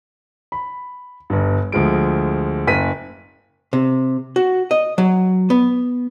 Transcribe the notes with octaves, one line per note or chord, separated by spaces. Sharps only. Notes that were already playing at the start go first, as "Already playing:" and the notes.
B5
G1 G2
D2 F3 G#3 D7
F#1 B6 D#7
C3
F#4
D#5
F#3
B3